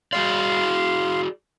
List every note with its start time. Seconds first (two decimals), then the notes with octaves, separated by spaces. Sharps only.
0.13 F#4 G#4 D5 F5 C6